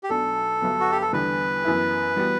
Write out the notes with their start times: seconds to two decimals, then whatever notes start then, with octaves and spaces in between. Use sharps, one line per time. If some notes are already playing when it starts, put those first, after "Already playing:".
0.04 G4
0.09 B1 B2 F#3 A3 D4 A4
0.61 G1 G2 F#3 B3
0.80 F#4
0.92 G4
1.01 A4
1.13 E2 D3 G3 B3 D4 B4
1.64 F#2 E3 B3 E4
2.16 E3 G3 B3 F#4